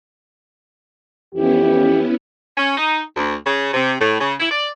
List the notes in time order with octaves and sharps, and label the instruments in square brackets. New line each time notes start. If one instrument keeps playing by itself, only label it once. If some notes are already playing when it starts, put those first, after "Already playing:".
[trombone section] F2 E3 G4 [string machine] B3 C#4 E4
[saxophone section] C#4
D#4
D2
C#3
C3
A2
C#3
E4
D5